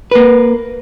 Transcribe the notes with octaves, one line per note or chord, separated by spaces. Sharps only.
A#3 B4